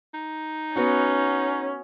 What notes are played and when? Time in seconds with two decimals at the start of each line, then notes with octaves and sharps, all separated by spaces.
0.14 D#4
0.76 B3 C#4 F#4 F#5